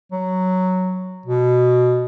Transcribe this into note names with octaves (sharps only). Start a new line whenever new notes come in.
F#3
B2